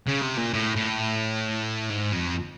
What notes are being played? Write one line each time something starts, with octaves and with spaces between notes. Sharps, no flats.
C#3
C3
A#2
A2
A2
G#2
F2